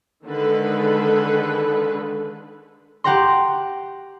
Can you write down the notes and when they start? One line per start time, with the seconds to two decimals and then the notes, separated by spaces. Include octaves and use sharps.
0.25 D3 D#3 G#3 A4 B4
3.04 G4 F#5 G5 A#5 C6